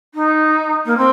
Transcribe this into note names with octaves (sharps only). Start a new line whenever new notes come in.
D#4
A#3
C4